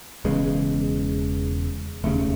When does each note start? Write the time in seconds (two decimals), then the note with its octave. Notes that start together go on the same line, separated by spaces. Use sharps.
0.25 E1 E2 C#3 G#3
2.04 E1 D#2 C#3 A3